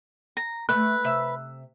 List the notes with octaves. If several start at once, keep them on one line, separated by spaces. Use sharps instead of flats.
A#5
A3 B4 F#6
C3 E5